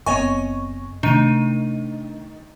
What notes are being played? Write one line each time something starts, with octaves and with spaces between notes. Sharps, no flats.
F#1 B3 C4 C#5 D#5 G#5 C#6
C3 D#3 A3 D4 D#7